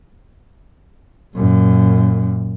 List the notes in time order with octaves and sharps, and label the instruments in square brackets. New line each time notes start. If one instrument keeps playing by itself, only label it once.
[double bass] F#2 A#2